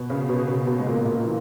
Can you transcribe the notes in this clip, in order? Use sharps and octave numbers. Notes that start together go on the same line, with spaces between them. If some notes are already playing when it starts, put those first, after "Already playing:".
Already playing: B2 B3
C#3 C#4
B2 B3
B2 B3
B2 B3
G#3
A#2 A#3
A#2 A#3
E3